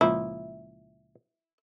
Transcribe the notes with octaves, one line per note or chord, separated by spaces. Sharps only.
C#2 A#2 F3 E4